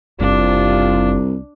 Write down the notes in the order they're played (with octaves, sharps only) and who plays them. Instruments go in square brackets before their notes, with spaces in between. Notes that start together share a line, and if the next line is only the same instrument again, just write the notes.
[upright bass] F#1 [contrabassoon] C2 [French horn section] C3 C4 F4 [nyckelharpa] D4